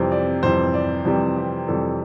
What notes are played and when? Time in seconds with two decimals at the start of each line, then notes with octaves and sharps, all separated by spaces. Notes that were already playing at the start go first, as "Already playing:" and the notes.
Already playing: F2 C3 E3 G3 C5
0.12 D5
0.43 F2 C3 E3 G3 C5
0.74 D5
1.05 F2 C3 E3 G3
1.36 G4
1.68 F2 C3 E3 G3 A4